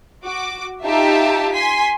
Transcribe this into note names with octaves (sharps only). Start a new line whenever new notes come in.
F#4 D6
D#4 F4 G4 E5 A5 A#5
G#5 C6 B6